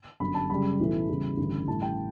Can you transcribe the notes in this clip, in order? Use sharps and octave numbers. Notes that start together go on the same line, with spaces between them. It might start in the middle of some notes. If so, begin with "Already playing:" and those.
G1 F#2 D3 B5
A5
F#2 C#3 G3 B5
B1 A2 E3 A3
E2 C#3 E3 G3
A1 G2 D3
A1 A2 G3 A5
G5